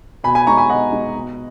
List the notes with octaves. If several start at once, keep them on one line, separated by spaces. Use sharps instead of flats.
B2 G#5 B5
G#5 B5
G#3 D#4 A#5 C#6
G#5 B5
B2 D#5 F#5
G#3 D#4
B2